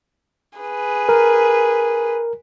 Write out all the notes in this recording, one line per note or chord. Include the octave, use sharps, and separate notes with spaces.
G#4 B4
A#4